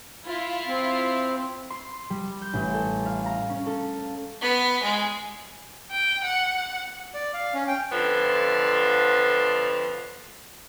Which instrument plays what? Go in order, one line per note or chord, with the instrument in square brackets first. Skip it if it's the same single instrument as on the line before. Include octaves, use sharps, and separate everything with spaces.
[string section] E4 F4
[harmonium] C4
[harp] C6
G3
G6
A1
A4
F5
A#5
C#4
A4
[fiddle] B3
G#3
[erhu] G5
F#5
[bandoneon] D5
F5
C#4
G5
[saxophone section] F2 D3 F3 B3